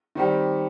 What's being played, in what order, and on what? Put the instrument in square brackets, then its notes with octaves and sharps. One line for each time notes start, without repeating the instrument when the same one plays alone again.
[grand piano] D#3 G3 C4 G4